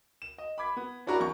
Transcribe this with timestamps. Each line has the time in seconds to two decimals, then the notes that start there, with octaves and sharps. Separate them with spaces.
0.22 E7
0.38 D#5
0.58 B5 D6 G#6 B6
0.77 B3
1.07 C#4 D4 E4 F#4 A#4 A#5
1.20 E2 C#6